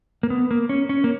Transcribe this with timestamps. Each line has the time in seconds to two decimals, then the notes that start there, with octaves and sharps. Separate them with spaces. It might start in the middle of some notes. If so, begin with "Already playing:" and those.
0.23 A#3
0.30 B3
0.51 A#3
0.69 C#4
0.89 C#4
1.04 A#3